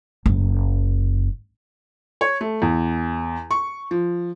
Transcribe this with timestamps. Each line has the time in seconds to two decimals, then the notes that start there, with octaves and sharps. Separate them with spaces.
0.26 F#1
2.21 C#5
2.41 A3
2.62 E2
3.51 C#6
3.91 F3